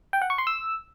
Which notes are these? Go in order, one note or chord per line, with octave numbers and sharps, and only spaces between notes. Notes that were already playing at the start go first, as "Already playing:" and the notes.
G5
F#5
C#6
C6
E6